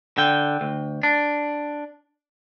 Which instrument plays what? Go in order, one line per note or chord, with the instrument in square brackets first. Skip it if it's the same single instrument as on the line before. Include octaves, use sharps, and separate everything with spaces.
[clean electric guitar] D3 G5
D2
D4